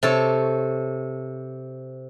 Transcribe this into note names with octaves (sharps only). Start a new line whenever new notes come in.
C3 A4 C#5